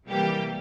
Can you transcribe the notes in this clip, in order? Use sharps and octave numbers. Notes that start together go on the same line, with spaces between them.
C3 E3 G3 A#3 G4